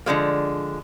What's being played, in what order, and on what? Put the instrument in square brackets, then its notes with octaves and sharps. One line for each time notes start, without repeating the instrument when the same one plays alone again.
[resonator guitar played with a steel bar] D3 F3 G#3 A#3